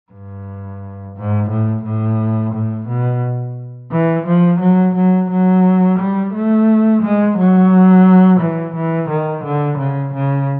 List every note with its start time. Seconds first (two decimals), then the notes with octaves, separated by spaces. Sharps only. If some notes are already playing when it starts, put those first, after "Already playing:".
0.12 G2
1.16 G#2
1.50 A2
1.85 A2
2.54 A2
2.88 B2
3.92 E3
4.27 F3
4.61 F#3
4.95 F#3
5.31 F#3
5.99 G3
6.34 A3
7.02 G#3
7.38 F#3
8.40 E3
8.75 E3
9.10 D#3
9.44 D3
9.79 C#3
10.14 C#3